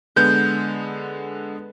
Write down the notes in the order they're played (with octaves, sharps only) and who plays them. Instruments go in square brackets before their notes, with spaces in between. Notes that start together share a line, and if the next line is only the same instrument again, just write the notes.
[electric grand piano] D3 G#3 B3 [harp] G6